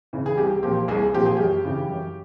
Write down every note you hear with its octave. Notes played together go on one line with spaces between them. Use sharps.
C#3 E3
G#4
C2 G4
A#2 F3 G4
C2 G#4
A#2 F3 G4
G#4
F#2 G4
C#3 E3
F#2